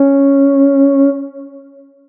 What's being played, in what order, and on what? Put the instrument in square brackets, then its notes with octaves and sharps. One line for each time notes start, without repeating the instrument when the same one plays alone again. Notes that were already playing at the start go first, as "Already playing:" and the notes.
Already playing: [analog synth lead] C#4